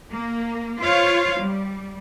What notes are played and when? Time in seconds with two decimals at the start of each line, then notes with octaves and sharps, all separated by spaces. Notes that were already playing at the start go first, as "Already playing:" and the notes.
0.10 A#3
0.80 F4 C5 C#5 F5
1.40 G3